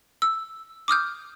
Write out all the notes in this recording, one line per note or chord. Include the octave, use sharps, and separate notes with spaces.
E6
D6 D#6 F6 G6